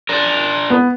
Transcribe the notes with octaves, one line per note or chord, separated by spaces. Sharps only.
D4 A#4
B3